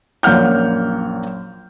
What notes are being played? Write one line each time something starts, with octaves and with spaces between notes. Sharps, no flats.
A#1 F#2 A#3 F#5 F6 G6